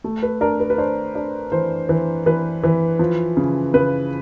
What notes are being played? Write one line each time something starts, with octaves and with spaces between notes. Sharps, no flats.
A3
B4
D4 A#4
B4
B4
D4 C5
D4
E3 C5
E3
E3 B4
E3
F3
C#3
C#3 B4